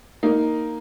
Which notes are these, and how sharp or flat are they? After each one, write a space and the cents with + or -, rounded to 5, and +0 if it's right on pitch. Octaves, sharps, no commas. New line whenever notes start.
A#3 +0 D#4 +5